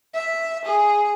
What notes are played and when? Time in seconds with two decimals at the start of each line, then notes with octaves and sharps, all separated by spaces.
0.14 E5
0.65 G#4